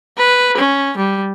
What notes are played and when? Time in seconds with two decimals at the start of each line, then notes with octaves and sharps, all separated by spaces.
0.17 B4
0.58 C#4
0.98 G3